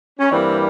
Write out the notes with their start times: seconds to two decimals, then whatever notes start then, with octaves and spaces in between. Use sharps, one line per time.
0.20 C#4
0.32 G2 E3 G3 A#3 C4 D4